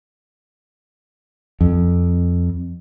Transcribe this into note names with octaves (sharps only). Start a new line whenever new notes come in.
F2